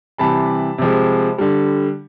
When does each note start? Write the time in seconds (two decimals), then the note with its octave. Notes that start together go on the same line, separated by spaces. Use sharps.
0.18 C3 E3 G3 A5 B5
0.78 C3 F3 G#3
1.38 D3 G3